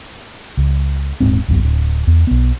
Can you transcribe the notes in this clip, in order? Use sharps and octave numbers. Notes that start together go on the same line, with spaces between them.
C#2
D#1 G#2 C4
D1 B1 F#2 B2
D1
E2
B1 B3